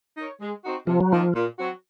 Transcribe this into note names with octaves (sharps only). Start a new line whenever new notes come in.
D#4 A#4 C#5
G#3
C4 D#4 F#4
C3 F3
F#3
D#3 F3 A#3 F4
A#2
F#3 C4 F#4